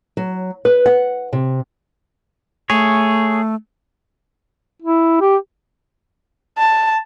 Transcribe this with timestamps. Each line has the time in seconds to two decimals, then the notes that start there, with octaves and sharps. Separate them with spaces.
0.17 F#3
0.65 B4
0.86 F#5
1.33 C3
2.70 A3 G#4 C#5
4.82 E4
5.21 G4
6.58 A5